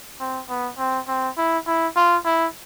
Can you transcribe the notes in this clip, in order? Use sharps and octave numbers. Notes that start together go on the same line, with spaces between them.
C4
B3
C4
C4
E4
E4
F4
E4